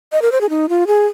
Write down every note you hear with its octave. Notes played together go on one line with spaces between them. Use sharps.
D#5
A#4
C5
G#4
D#4
F4
G#4